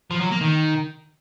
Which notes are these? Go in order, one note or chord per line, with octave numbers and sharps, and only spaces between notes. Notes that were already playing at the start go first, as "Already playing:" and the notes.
F3
F#3
A#3
D#3